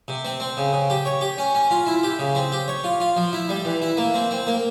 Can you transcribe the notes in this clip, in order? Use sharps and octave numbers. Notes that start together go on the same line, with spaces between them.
C3
C4
C4
C#3
C#3
G4
C#5
G4
C#4
C#4
F4
E4
G4
C#3
C4
G4
C#5
F4
F4
F3
E4
G3
E3
E4
A#3
C4
C4
A#3